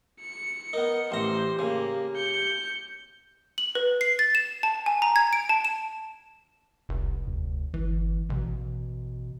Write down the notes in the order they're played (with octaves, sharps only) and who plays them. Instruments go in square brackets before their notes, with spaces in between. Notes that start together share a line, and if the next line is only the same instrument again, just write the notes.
[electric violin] C#7
[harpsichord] B3 D#4 [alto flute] A#4
[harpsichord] A1 A#5 [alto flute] G4 [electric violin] C5
[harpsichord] C#3 [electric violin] A#3
[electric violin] G6 C#7
[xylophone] F#7
B4
C7
A6
E7
A5
G#5
A#5
G#6
D7
A5
E7
[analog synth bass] F1 [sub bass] C2
[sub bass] D2
[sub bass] G1 [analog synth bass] E3
[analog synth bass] A1 [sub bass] B2